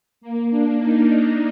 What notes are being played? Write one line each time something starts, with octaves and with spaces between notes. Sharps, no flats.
A#3
D4
D#4